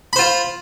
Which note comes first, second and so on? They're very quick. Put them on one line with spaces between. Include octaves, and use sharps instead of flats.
B5 C5 F4